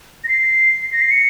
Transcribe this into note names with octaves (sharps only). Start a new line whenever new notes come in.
A#6
C7
A#6
C7
C#7